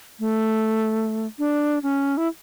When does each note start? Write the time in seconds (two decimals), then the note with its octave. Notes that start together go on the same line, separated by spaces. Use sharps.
0.20 A3
1.39 D4
1.83 C#4
2.17 E4